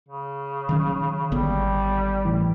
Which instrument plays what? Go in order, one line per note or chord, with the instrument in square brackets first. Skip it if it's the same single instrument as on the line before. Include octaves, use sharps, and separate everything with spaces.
[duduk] C#3
[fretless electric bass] D#3 F#3 C#4
[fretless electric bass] G#1 D3 B3 [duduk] G3
[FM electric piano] A2 E3